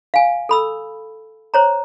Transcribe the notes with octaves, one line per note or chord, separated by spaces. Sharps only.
F5 G#5
A4 B5 E6
C5 C#5 A#5